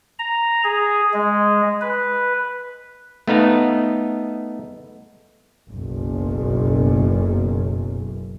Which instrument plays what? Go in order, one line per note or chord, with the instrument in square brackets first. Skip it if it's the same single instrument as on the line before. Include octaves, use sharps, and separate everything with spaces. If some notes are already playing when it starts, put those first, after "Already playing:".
[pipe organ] A#5
G#4
G#3
B4
[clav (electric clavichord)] A3 B3 D#4 F5
[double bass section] F#1 B1 F#2